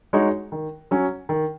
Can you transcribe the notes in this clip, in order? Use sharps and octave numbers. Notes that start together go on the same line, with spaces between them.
G#3 D#4 F#4 C#5
D#3
F#3 C#4
D#3